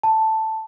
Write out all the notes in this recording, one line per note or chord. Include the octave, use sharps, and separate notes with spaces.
A5